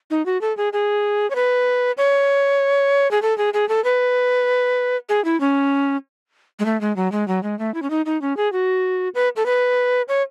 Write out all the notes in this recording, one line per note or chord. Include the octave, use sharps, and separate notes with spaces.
D#4
F#4
A4
G#4
G#4
C#5
B4
C#5
G#4
A4
G#4
G#4
A4
B4
G#4
E4
C#4
G#3
A3
G#3
F#3
G#3
F#3
G#3
A3
E4
C#4
D#4
D#4
C#4
G#4
F#4
B4
A4
B4
C#5